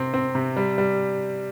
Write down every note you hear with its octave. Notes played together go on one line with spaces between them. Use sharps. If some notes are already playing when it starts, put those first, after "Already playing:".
Already playing: C3 C4
C4
C3
G3
G3